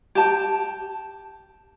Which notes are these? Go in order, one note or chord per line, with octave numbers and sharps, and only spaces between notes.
G4 A5